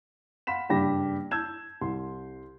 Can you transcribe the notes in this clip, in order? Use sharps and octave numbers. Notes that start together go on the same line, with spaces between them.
F5 F#5 B5 C6 B6 E7
F#1 G2 D4 G4 B5 A#6
A5 E6 G6 G#6 E7
C2 C6